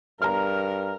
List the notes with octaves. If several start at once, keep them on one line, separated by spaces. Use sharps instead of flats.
G2 A#4 A#5 F6